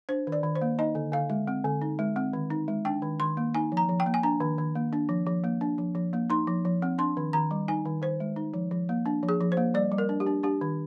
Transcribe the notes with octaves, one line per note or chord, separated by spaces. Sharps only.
D4 C5
D#3
D5
D#3
C5
A#3
D#4 D#5
D3
D3 F5
G#3
C4
D3
D#4
G#3
C4
D#3
D#4
G#3
D4 G5
D#3
D#3 C6
A#3
D#4 G#5
F3
A#5
F3
G5
A#3
G#5
D4 A#5
D#3
D#3
A#3
D4
F3
F3
A#3
D4
F3
F3
A#3
D#4 C6
F3
F3
C4
D4 C6
D#3
D#3 A#5
G3
D#4 G#5
D#3
D#3 C5
G#3
D#4
F3
F3
A#3
D4
F3
G#4
F3
C5
A#3
G3 D5
G3
A#4
D4
G4
D4
D4 G4
D#3